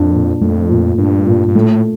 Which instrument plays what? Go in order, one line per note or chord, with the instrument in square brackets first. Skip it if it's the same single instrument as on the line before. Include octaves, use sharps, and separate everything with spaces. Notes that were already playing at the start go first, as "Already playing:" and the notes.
Already playing: [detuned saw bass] F2 [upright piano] A#2 D4
[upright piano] A#2
[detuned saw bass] F2 [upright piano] A3
[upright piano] A#2
[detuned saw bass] G2 [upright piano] D4
[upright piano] A#2
[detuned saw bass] G2
[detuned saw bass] A2 [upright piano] A3